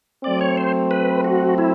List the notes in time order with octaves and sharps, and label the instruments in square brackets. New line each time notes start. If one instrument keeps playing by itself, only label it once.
[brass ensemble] F#3 A3 C4 [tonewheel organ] D5
[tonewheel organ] C#5
C5
B4
F#4
E4